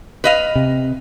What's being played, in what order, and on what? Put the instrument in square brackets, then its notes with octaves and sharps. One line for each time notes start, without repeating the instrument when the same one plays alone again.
[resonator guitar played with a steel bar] B4 D#5 F5
[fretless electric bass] C3